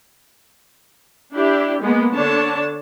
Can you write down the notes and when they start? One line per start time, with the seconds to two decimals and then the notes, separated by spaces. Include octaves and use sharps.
1.35 D4 E4 G4
1.82 G#3 A#3 B3
2.14 D3 D4 C#5 A5